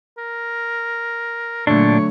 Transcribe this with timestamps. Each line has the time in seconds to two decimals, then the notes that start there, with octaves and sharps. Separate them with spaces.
0.18 A#4
1.67 A#2 D3 F#3 A3 D4 C#5